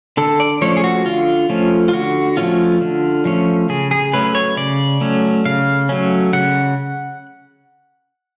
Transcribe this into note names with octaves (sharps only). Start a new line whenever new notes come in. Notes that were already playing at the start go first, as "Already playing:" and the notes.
D3 A4
D5
F3 A3 C#4 C#5
G#4
F#4
D3 F4
F3 A3 C#4
F4
D3 F#4
F3 A3 C#4 F4
D3
F3 A3 C#4
C#3 G#4
G#4
F#3 A3 C#4 B4
C#5
C#3 D5
F#3 A3 C#4
C#3 F5
F#3 A3 C#4
C#3 F#5